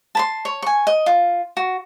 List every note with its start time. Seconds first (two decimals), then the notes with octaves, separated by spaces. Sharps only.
0.15 A5 B5 C6
0.45 C#5
0.62 G#5 C#6
0.87 D#5
1.06 F4
1.57 F#4